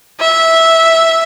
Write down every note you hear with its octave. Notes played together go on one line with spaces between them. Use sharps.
E5